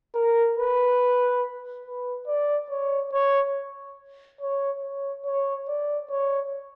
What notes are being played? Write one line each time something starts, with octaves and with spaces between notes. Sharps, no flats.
A#4
B4
B4
D5
C#5
C#5
C#5
C#5
C#5
D5
C#5